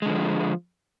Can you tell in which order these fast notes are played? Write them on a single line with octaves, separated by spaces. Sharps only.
G#3 D3 E3 F3